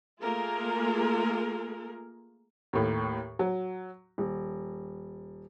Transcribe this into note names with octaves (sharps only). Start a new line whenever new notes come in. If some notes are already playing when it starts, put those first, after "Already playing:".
A3 A#3 F4 G#4 A#4
D#2 A2
F#3
D#1